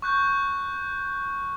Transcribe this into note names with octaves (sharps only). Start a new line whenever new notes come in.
C#6 F#6 G6